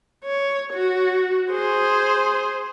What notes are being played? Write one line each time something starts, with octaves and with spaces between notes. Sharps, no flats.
C#5
F#4
G#4 C5